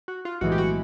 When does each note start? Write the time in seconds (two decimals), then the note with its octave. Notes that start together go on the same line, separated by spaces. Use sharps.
0.08 F#4
0.25 F4
0.41 B1 A2 E3 G#3 F#4
0.52 G4
0.58 F#4